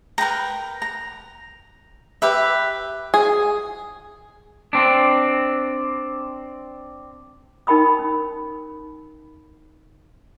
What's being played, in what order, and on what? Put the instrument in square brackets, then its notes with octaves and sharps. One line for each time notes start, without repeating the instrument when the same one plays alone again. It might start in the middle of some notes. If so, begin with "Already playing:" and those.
[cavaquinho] A#4 B4 G5 A#5
A#5
G4 B4 E5
[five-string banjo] G#4
[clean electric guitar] C4 D4
[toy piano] D#4 A#4 G5 B5 D#6
C#4